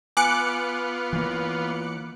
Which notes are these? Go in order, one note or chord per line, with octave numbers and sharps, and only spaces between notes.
B3 F4 G#5 D6 F#6 C#7
E3 A#3